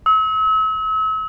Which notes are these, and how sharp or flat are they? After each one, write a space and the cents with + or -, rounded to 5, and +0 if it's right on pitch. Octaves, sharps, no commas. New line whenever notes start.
E6 -40